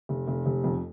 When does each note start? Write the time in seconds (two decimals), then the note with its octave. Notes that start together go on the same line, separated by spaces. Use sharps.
0.09 F1
0.28 F1
0.46 F1
0.64 F2